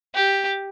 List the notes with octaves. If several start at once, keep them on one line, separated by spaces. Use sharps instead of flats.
G4